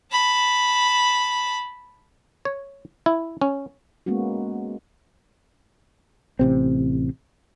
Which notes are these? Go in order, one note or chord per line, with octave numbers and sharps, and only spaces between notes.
A5 B5
C#5
E4
C#4
G#3 A#3 B3 C#4 F#4
A1 C3 C4